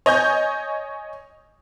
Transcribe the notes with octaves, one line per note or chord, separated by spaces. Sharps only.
C#5 D#5 G#5 G6